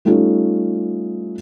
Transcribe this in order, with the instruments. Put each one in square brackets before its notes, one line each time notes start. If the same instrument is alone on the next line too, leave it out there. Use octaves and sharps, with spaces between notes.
[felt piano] G3 A3 C#4 D#4 F4